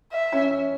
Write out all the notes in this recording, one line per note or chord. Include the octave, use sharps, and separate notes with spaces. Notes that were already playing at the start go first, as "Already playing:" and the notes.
E5
C#4